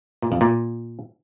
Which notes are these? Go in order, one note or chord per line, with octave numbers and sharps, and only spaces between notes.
A#2
F2
A#2